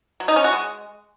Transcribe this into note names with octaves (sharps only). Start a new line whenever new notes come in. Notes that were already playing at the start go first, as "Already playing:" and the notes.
F#3
D#4
C#4
F#4
G#3